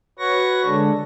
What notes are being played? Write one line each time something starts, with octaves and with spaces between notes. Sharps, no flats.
F#4 B4 C#5 F#5 C#6 A#6
D3 G#3 D4 A4